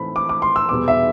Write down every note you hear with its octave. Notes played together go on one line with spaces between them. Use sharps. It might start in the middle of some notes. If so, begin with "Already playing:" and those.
Already playing: A2 E3 A3 C4 B5
D6
D6
C6
E6
E2 B2 G3 B3 D6
E5